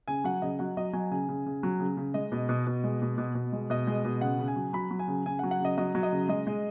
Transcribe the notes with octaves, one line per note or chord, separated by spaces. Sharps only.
C#3 G#5
F#3 F#5
C#3 D#5
F#3 F#5
F#3 D#5
F#3 G#5
C#3 G#5
C#3
C#3
F#3
C#3
C#3
G#3 D#5
B2
B2
B2
G#3
B2
B2
B2
G#3
B2 D#5
G#3
B2
C#3 F#5
C#3
G#5
F#3
F#3 B5
F#3
G#5
C#3
C#3 G#5
F#5
F#3
F#5
C#3 D#5
F#3 D#5
F#3
D#5
C#3
G#3 D#5
G#3